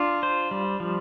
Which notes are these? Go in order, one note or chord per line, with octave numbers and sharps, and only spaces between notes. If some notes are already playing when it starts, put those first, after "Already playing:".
Already playing: D4 F4
C5
G3
F3